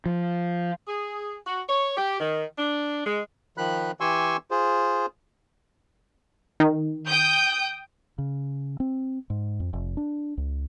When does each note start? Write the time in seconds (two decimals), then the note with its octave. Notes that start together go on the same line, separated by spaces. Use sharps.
0.06 F3
0.88 G#4
1.46 F#4
1.69 C#5
1.97 G4
2.20 D#3
2.58 D4
3.06 G#3
3.57 D#3 F3 B5 F#6
4.01 E3 G4 G#5 C6 C#6 E6
4.51 F4 G#4 C5
6.60 D#3
7.06 G5 D#6 G6
8.18 C#3
8.80 C4
9.30 G#2
9.60 F2
9.73 F1
9.97 D4
10.37 C#2